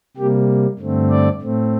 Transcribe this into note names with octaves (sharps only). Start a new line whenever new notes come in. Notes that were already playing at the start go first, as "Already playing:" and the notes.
C3 G3 A#3 G4
G2 D3 A3 C4
D5
A2 A3 C4